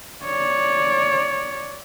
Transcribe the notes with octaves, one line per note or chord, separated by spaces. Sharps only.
C#5 D5